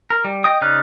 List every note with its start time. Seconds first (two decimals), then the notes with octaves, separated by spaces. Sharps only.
0.10 A#4
0.25 G3
0.44 D#5 G5 D#6
0.61 C#3 D#4 D5 F6 F#6